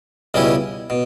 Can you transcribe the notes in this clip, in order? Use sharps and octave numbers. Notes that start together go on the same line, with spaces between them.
C#2 B2 G3 C#4 E4
B2